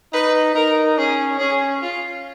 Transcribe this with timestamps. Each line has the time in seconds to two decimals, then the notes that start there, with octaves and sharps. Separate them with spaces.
0.13 D#4 B4
0.55 D#4 A#4
0.98 C#4 G#4
1.39 C#4 G#4
1.83 F4